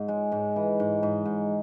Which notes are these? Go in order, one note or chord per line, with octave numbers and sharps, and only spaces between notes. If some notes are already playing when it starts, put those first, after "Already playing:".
Already playing: G#2
G#3
G#2
E3
G#2
G#2
G#2